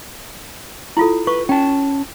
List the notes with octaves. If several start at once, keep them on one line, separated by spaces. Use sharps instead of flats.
E4 F4 A4
B4 C#6
C#4 G5 A5